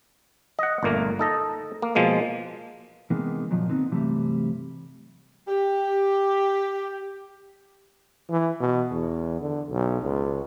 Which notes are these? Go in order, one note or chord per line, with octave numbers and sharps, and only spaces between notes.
D#5 F#5
G1 A#2 A3 A#3 A#4
D#4 A4 D#5
A#3
B2 F3 G#3 A#3
C3 D#3 E3 G#3 A#3 B3
F#2 A#2 D#3 F3 F#3
D3 B3 C4 D#4
G2 C3 E3 F#3 G3 A3
G4
E3
B2
E2
D3
B1
C#2